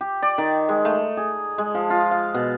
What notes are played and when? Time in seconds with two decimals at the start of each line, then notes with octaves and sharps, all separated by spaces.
0.01 G4
0.23 D5
0.38 D#3
0.69 G#3
0.85 A3
1.17 G#4
1.58 G#3
1.75 F3
1.90 F4
2.11 F5
2.35 B2